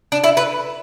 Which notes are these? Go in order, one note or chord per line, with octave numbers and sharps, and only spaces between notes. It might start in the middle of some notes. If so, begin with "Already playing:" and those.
D4
E4
B4